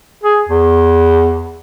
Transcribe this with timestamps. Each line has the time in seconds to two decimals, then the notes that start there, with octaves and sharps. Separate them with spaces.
0.24 G#4
0.48 E2